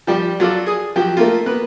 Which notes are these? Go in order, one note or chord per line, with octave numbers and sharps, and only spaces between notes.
F3 G3 G4
F#3 F4 A4 D5
G#4 D#6
F3 F#3 G4
A3 A#3 F4
A#3 B3 B4